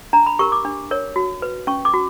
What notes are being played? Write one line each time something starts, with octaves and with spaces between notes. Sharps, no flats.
D4 A#5
B5
G4 A#4 C#6
D6
D4
A#4 C#5
F#4
B4
C#4 C#6
D6
F#4